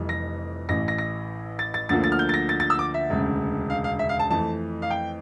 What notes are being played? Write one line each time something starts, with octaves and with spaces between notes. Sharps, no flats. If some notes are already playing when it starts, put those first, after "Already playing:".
Already playing: F1 F2 E3 G3
A#6
A1 A2 E3 A#6
A#6
A#6
A6
A6
D2 D3 F3 A#3 A6
A6
F6
G6
A6
A#6
A6
A6
E6
D6
E5
E1 D2 C#3
F5
F5
E5
F5
A5
F2 E3 A3 A5
F5
G5